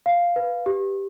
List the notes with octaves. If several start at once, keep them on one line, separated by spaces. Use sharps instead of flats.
F5
B4
G4